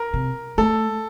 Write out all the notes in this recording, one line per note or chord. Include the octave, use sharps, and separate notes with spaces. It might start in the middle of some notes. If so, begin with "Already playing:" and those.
Already playing: A#4
C3
A3 A4